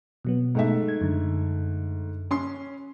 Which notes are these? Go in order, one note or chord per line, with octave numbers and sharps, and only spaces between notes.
B2 F#3 B3
G#2 A3 E5
G#6
F#2 D3
C#4 C6